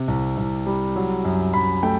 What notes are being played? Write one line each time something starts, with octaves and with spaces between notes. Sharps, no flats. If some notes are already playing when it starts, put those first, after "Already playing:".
Already playing: C3
C2
C2
G3
F#3
F#2
F#2 B5
A3 G5